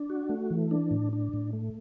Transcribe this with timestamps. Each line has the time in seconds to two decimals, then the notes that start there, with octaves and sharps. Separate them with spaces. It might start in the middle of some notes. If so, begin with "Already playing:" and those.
Already playing: D4
0.10 F#4
0.29 A3
0.50 E3
0.71 D4
0.91 A2
1.13 D4
1.33 A2
1.53 A3